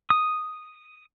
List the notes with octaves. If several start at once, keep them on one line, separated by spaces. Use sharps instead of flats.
D#6